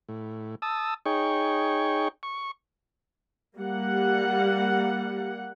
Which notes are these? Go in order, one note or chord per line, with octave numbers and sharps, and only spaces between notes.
A2
A5 D#6 E6
D#4 G#4 C#5 G5 C#6
C#6
G3 A#3 F#5